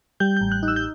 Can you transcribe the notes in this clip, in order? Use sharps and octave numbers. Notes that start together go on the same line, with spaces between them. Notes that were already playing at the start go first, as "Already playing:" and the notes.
G3 G6
A1 G6
F#6
D#4
E6
G6